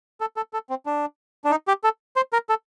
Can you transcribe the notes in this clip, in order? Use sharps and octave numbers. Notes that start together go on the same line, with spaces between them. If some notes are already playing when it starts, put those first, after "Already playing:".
A4
A4
A4
C4
D4
D4
D#4
G4
A4
C5
A#4
A4